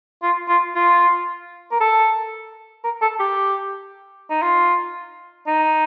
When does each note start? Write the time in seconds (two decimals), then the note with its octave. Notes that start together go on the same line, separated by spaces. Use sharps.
0.23 F4
0.49 F4
0.75 F4
1.72 A#4
1.80 A4
2.84 A#4
3.02 A4
3.20 G4
4.30 D#4
4.42 F4
5.47 D#4